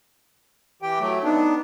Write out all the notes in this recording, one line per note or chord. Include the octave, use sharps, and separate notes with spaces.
E3 G4 G5
F#3 A3
B3 D4 D#4